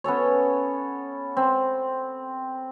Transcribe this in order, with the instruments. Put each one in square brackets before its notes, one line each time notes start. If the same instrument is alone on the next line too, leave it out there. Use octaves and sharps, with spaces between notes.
[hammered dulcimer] B3 C#4 A4 C#5
C4